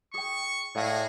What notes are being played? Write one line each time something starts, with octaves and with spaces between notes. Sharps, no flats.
G#4 G5 C#6
A2 F#4 G#4 D5 F5